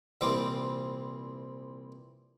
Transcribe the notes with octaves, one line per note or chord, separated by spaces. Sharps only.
C2 A#2 E3 G3 C4 D6